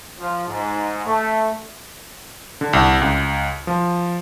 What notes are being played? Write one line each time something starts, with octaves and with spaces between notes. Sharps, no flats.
F3
G#2
A3
D3
C2
C#2
F3